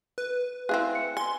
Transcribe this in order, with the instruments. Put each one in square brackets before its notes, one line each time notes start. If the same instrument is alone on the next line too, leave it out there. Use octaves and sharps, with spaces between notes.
[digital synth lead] B4
[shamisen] C4 E4 G#4 [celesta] E5 F5 F#6
[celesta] C#7
[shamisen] G#5 [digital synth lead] C6